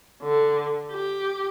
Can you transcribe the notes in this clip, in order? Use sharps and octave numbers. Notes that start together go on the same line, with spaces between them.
D3
G4